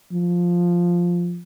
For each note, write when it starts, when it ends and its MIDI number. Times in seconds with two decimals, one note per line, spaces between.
0.12 1.42 53